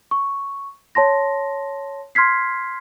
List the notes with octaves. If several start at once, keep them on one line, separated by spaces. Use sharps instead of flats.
C#6
C#5 A5 C6 A#6
C6 F6 G#6 B6 C7